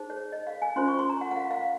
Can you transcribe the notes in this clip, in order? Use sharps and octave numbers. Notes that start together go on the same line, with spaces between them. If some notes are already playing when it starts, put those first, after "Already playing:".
Already playing: D#4 G#4 C5
C#5
D#5
F5
G#5
C#4 F4 C5 C6
C#6
C6
A#5
F#5
F#5
F5
F5